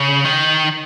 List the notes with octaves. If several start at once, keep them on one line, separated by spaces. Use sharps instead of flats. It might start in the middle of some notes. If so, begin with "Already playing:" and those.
Already playing: C#3
D#3